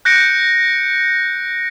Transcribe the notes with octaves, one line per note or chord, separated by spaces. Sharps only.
F#6 G6 A#6 C#7 D7